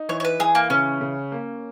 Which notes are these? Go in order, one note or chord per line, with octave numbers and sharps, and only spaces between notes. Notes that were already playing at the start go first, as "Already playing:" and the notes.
Already playing: D#4
E3 C#5
C#5
B4
E3 G#4
A#3
C#3 C#4
C#3
A#3